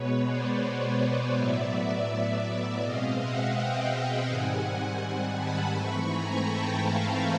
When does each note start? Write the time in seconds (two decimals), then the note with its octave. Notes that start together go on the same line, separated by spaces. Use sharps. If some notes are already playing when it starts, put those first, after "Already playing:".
Already playing: B2 G#3 B3 B4 C#5
0.27 C5 D5
1.37 A2 F#3 B3 D5 E5
2.82 B2 G#3 C4 D#5 F5
3.18 E5 F#5
3.54 F5 G5
4.27 G#2 D#3 G3 C4 F#5 G#5
5.00 F#5 G#5
5.36 A5 B5
5.73 G#2 E3 A3 C4 B5 C#6
6.08 G#5 A#5
6.45 G5 A5
6.81 F5 G5